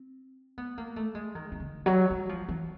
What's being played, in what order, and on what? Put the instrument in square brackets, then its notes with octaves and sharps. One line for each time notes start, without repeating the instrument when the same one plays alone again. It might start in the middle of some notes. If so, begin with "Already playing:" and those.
Already playing: [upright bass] C4
B3
A#3
A3
G#3
D#3
D#3
D3
F#3
G3
F3
E3